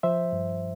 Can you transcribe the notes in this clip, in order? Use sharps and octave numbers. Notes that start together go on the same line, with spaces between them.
F3 C5 E5
G2